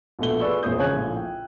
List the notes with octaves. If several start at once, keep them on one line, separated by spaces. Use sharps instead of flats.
A#1 B2 A3 G7
F4 G#4 B4 D5 C#6 E6
E1 A#1 G#3 C5 D#6 G6
C#3 C#5 G#5 F#6 G#6
A#1 A2
G5